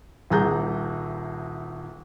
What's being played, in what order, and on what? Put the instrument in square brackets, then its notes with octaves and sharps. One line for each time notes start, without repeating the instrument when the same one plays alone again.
[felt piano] D#1 C2 G#4 A#5 G6